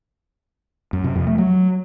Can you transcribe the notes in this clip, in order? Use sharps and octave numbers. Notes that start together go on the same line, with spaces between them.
F#2
C3
F2
A3
F#3